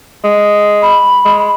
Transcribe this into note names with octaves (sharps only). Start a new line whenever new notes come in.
G#3
B5
G#3